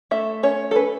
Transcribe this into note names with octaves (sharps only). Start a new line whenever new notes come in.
A3 E5
C#4 C#5
A4
C#4 B4